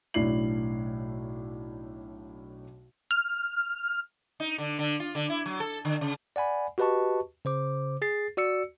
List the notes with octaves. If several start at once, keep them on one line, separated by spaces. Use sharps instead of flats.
B1 A2 D4 E4 C7 F#7
F6
D#4
D3
D3
F4
D3
E4
F#3
A4
D3
C#3
D5 F#5 G#5 B5
F#4 G4 B4 D#5 A5 C#6
C#3 C5 D6
G#4 A6 C7
F#4 D5 E6 C#7